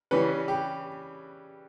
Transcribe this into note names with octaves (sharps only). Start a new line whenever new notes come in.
C#3 E3 G3 C#4 B4
G4